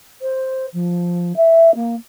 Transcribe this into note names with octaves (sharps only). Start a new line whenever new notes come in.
C5
F3
E5
A#3